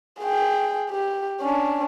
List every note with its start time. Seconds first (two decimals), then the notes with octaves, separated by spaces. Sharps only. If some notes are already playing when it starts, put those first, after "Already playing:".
0.21 G#4 G5
0.91 G4
1.41 C#4 D4